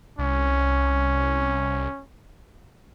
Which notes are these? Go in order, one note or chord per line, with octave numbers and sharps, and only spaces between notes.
C2 C#4